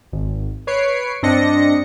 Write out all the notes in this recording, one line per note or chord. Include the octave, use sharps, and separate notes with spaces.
G#1
B4 C#5 C7 D7
G2 C4 D4 D#5 A#6 C#7